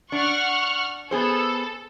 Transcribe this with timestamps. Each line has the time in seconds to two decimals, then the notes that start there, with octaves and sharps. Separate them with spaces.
0.12 D4 F#5 C#6 F6
1.11 B3 G#4 A4 C5